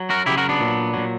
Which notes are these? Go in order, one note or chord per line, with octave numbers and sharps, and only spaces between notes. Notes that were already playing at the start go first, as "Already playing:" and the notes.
Already playing: F#3
F#4 A#4
C#3 F#3 E4 G4
F#4 A#4
B3 D4
A#2 F#3
A#2 F#3